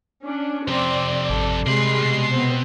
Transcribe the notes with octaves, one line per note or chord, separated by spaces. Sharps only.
C#4 D4
F2 C3 C4 D5
G#1 A4
C3 G3 G#3 A#4 B5 C6 C7
B2
B3 C4 C5